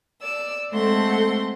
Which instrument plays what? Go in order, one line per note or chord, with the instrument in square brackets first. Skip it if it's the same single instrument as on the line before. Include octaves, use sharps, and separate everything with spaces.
[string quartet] D5 E6
G#3 A3 C4 A4 F#5 C6